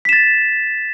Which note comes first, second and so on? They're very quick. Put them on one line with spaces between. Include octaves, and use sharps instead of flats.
B6 E7 A6